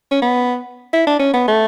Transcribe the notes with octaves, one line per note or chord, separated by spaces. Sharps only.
C#4
B3
E4
D4
C#4
B3
A3